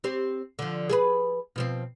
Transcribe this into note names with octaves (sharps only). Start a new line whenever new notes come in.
C4 G4 C5
D3 F3
G#4 A4 B4
B2 F3 C4